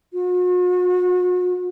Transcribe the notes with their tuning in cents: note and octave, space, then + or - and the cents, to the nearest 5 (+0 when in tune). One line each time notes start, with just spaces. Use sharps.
F#4 -45